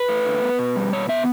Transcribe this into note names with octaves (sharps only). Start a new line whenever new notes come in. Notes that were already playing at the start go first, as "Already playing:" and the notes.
Already playing: B4
A3
D3
B3
B2
G3
B2 C#5
B3 E5